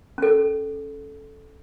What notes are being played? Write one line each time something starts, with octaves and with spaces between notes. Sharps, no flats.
C#4 A4